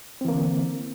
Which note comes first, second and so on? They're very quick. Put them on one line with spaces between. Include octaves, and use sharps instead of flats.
C4 E3 A#3 D3